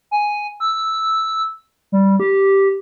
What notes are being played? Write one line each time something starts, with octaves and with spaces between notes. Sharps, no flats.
G#5
E6
G3
G4